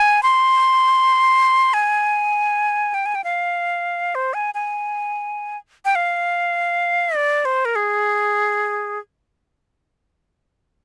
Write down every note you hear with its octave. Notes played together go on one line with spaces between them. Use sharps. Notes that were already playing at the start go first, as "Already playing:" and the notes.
Already playing: G#5
C6
G#5
G5
G#5
G5
F5
C5
G#5
G#5
G5
F5
D5
C5
A#4
G#4